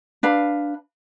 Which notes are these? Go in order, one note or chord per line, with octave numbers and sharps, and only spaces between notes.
D4 B4 F5